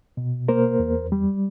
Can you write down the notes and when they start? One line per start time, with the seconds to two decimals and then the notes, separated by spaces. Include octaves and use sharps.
0.17 B2
0.48 A#3 A#4 C5
0.80 E2
1.12 G3